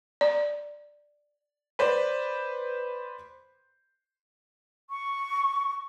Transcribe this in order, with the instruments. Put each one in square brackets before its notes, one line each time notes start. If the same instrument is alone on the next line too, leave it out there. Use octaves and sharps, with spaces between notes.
[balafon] D5
[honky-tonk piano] B4 C5 D5
[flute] C#6